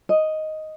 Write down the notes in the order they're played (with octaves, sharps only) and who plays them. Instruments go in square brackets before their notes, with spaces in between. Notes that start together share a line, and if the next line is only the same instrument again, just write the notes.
[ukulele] D#5